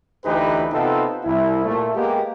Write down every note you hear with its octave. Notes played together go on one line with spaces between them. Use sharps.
D2 E3 D#4 G4 B4
C3 B3 C4 D#4 F4 A4
C2 E4
A#2 A3
G#3 A#3 B3 G4